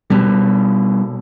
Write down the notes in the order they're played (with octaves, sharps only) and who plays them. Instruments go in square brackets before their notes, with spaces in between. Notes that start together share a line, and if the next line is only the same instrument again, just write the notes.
[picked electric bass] B2 G3